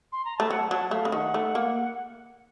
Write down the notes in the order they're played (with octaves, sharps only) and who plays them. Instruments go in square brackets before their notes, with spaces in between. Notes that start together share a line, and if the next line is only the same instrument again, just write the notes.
[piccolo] C6
A#5
[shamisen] A3 [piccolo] A5
[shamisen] F#3 [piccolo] F#5
[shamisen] F#3 [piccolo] A5
[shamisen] A3 [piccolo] F5
[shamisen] C#3
[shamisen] D#3 [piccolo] F#5
[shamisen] A3
A#3